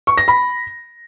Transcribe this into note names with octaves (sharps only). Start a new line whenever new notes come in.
C#6
A#6
B5